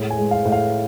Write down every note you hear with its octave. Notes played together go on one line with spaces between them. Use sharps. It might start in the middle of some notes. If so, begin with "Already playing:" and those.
Already playing: A2 G#3
G#5
G#3
F5
A2
F5